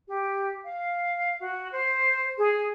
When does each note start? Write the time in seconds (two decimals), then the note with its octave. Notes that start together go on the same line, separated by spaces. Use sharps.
0.08 G4
0.64 F5
1.39 F#4
1.71 C5
2.37 G#4